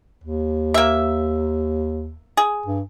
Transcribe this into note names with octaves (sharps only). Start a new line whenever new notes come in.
D#2
A#3 E5
G#4
G2